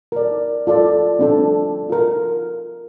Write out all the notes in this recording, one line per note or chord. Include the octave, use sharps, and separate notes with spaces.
A#4 D5
F4 A4 D5
C4 D4 A4
F4 A#4